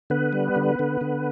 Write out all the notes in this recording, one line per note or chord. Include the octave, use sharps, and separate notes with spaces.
D3 B3 B4
G3
D3
D3
D3